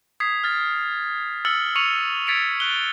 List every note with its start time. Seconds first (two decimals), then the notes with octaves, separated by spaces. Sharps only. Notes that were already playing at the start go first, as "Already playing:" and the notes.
0.20 D#6 G#6 B6 C7
0.44 F6 A6
1.45 E6 F6 A6 C#7 F#7
1.76 C#6 C#7 D#7 F7 F#7
2.27 G#6 A6 B6 C#7 D7 F7
2.60 F#6 G7